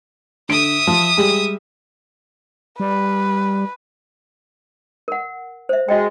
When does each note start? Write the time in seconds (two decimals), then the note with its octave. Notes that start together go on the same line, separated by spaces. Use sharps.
0.49 D3 E5 D#6 D7
0.87 F3
1.17 G3 G#3
2.80 G3 B4
5.08 A#4 F#5
5.69 C5 E5
5.89 G#3 F#4 D#5 G5